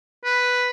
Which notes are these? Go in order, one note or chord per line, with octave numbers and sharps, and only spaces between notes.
B4